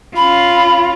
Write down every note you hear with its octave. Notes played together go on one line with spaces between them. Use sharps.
C#4 F4 B5